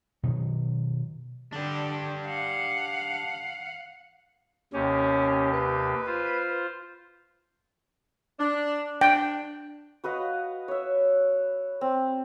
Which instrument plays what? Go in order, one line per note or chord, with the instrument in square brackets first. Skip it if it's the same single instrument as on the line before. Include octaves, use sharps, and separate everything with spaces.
[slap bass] B2 D#3 F#3
[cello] D3 [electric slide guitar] D4 G4
[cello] F5 F#5
[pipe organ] D#2 C3 G4 [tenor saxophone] C#4
[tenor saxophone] B4
[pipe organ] F4 C5
[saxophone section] D4
[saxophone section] D4 [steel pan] G5
[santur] F#4 B4 D#5 F5
C#5 E5
C4